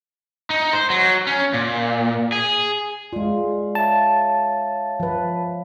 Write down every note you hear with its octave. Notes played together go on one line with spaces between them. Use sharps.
D#4
C5
F#3
C#4
A#2
G#4
G#3 F4 D5
C#5 E5 F5 A5
F3 B4